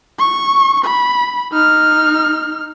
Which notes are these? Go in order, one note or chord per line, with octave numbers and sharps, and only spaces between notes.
C#6
B5
D#4 F6